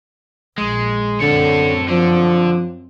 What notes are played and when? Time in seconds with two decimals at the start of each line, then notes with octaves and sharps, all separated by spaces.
0.58 A#1 G#3
1.21 F#2 D3 C4 A4 C#5
1.88 D3 F3